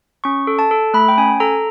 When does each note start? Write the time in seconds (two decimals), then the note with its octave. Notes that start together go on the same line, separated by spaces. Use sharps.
0.24 C#4 C#6
0.47 A4
0.59 A5
0.71 A4
0.94 A3 B5
1.08 G5
1.18 C#4 G#5
1.40 A4 A#5